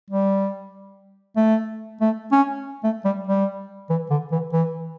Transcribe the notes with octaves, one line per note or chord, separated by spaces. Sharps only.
G3
A3
A3
C#4
A3
G3
G3
E3
D3
E3
E3